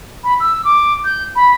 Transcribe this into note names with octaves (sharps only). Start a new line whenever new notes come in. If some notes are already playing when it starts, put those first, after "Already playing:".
B5
E6
D6
G6
B5